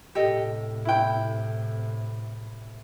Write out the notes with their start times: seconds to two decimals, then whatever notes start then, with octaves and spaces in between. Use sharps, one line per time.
0.15 A2 C3 G4 A4 D#5
0.85 E4 G5